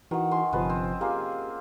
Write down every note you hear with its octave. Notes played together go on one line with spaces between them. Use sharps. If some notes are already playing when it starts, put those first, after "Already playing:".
D#3 E3 D#4 F#4 F#5
G#5 C6 C#6
G1 C3 F3 B4 D#5 A5
C4 C#4
A#3 F4 G4 G#4